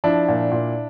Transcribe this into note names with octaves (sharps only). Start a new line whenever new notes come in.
F3 D4 E4
A#2
A#2